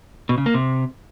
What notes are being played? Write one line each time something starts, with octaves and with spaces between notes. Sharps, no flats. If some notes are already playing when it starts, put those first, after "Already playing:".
B2
C#3
A#3
C3